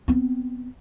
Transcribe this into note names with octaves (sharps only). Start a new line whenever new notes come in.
B3 C4